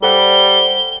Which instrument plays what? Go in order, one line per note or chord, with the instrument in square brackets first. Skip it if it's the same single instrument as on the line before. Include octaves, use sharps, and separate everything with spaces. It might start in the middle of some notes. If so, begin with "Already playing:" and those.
[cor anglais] G3 [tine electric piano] A4 C5 F#5 [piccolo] G7